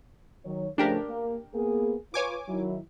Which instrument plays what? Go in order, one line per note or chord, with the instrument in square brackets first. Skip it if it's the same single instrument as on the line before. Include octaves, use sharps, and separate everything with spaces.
[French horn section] D#3 F#3 C#5
[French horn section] C#3 F3 A3 [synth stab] D4 G4 A#4
[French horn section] A#3
A#3 B3 G#4
[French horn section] F4 B4 [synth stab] C#5 G#5 D6
[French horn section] D#3 F#3 E4